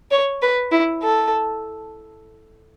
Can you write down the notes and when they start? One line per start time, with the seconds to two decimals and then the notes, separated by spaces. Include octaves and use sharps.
0.11 C#5
0.42 B4
0.72 E4
1.03 A4